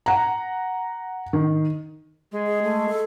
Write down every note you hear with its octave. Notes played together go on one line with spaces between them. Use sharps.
F#5 A#5
D#3
G#3
G#4
A3
A4